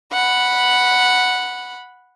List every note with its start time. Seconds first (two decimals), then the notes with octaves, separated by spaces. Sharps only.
0.12 F#5 B5